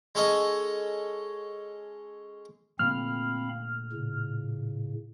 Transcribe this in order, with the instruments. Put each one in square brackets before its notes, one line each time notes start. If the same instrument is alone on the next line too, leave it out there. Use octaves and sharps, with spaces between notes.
[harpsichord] G#3 C#4 A4 D#5
[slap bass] A#2 D3 A3 [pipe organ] C4 F5 B5 [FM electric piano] F6
[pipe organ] A2 C#3